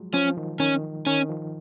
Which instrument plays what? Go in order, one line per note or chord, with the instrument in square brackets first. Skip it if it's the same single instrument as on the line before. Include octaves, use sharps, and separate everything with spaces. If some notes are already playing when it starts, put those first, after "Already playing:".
Already playing: [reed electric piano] F3 F#3 G#3
[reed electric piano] F3 [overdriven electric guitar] C#4
[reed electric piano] D#3
[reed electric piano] D#3 [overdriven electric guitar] C#4
[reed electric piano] D#3 [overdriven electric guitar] C#4
[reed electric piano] F3